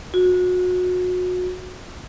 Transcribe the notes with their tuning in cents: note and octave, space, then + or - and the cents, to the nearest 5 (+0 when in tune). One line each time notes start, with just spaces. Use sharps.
F#4 -30